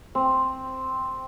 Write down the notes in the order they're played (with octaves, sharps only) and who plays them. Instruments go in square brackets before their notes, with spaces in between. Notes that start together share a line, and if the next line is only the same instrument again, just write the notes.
[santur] C4